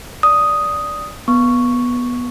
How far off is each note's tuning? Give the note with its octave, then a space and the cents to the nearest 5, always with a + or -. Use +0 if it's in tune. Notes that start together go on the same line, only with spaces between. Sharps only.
D5 -10 D#6 +0
B3 -10 C#6 +0